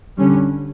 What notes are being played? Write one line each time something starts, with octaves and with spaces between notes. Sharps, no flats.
D3 G3 C#4